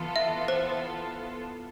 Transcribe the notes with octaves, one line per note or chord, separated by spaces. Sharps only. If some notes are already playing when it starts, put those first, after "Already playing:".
Already playing: E3 B3 F4 A4
E5
C5